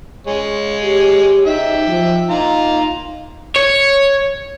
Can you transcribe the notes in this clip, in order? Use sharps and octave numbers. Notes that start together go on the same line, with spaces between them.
G#3 C#5
G4
D#4 E5 G5
F3
D#4 F4 A#5
C#5